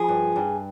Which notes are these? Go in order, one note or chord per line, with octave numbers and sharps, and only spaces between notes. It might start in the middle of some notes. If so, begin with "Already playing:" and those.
Already playing: F3 G#4
G2
G2